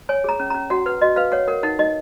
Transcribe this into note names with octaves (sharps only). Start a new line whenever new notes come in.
C#5 G#5
G#4 A#5
C#4
A#5
C#4
F#4 F#5
B4 F#5
F#4 D#5
B4 F5
C#5 F#5
A#4 F#5
D#4 F#5
D#4 D#5